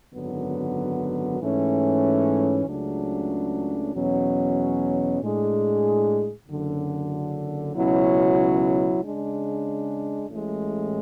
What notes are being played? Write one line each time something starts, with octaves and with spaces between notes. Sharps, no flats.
G#1 F#2 D3 F#3 B3
G#2 E3 A3 C#4
C#2 C#3 F#3 A3 D4
E2 B2 F#3 C#4
A2 G#3 D4 G#4
F#1 F#2 D3
C#2 B2 F#3 C#4 E4
C#3 G#3 D4
A1 A2 G#3